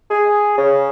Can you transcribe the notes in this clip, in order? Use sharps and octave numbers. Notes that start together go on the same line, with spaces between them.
G#4
C#3